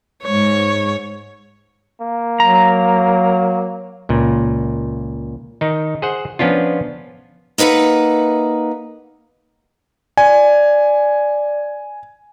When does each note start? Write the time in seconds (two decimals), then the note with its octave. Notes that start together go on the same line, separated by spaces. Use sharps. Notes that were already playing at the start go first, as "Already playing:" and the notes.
0.24 G#2 C#5
2.01 A#3
2.40 F#3 A#5
4.09 C#2 A#2
5.61 D#3 D#4
6.02 G#4 C5 F#5
6.39 F3 B3 C#4 D4 F4
7.58 A#3 D#4 B4 E5 F#5
10.17 D5 G#5